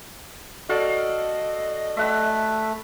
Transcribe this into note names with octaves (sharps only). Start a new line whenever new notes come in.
F#4 A4 D5 D#5 F5
A3 E5 F#5 B5